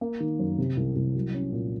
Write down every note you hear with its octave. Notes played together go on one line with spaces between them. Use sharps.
A#3
D#3
F#2
C3
C2
C2
F#3
C#4
A#2